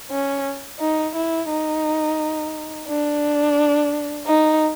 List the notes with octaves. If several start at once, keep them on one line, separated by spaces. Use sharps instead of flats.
C#4
D#4
E4
D#4
D4
D#4